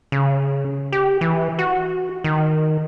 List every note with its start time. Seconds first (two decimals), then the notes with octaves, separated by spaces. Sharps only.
0.12 C#3
0.92 G4
1.21 E3
1.59 F#4
2.24 D#3